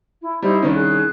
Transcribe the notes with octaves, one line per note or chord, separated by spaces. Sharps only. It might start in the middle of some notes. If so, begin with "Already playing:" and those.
E4
G3 D#4 E4 C5
C2 D#3 C#4
G#4 F#6